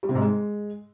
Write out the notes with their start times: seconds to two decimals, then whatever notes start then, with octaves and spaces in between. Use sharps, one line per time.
0.03 G3
0.09 C3
0.15 G#2
0.21 G#3